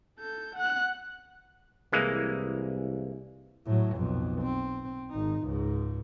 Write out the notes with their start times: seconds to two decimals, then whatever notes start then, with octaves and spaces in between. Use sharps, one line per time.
0.19 A4 G6
0.55 F#5 F#6
1.93 C2 E3 G#3 A#3
3.66 A2 F#3
3.96 B1 F2
4.42 C4
5.10 G#1 D#4
5.45 C#2 G#2